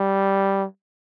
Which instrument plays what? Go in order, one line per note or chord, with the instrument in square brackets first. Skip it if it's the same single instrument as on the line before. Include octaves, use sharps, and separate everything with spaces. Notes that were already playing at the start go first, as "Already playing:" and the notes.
Already playing: [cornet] G3